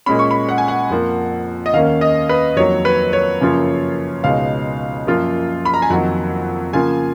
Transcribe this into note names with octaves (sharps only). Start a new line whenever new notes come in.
A#2 G#3 C#4 B5
C#6
B5
F#5
G#5
F#5
F2 F3 A#3
D#5
D#2 D#3 A#3 C#4 F5
D#5
B4
F2 D#3 F#3 A#3 C#5
B4
C#5
F#2 C#3 F3 A#3 F4
C#2 B2 G#3 D#4 F5
F#2 F3 A#3 F4
B5
A#5
G#5
F2 D#3 F#3 A#3 F#5
C#3 F3 A#3 F4 G#5